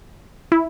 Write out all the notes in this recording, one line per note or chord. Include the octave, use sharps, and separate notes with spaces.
E4